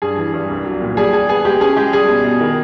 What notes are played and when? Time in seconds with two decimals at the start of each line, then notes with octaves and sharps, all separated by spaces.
0.02 G2 G#4
0.18 E3
0.34 G2
0.49 C2
0.65 F#3
0.81 A#2
0.97 G3 G#4
1.13 G3 G#4
1.29 B3 G#4
1.45 G#3 G4
1.61 C#4 G#4
1.76 G#3 G4
1.93 G3 G#4
2.09 B2
2.25 B2
2.40 D#3